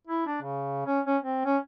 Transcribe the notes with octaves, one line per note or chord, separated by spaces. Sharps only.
E4
D4
C#3
C#4
C#4
C4
C#4